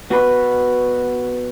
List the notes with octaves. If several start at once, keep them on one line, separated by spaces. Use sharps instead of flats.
B3 F#4 B4